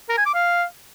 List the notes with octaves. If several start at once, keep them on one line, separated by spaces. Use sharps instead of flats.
A#4
G#5
D6
F5